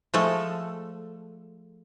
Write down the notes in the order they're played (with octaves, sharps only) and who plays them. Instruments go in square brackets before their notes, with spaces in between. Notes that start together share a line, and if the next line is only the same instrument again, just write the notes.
[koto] F3 G#3 A3 A4